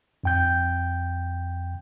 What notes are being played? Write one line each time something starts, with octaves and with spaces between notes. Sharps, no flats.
F2 G5 G6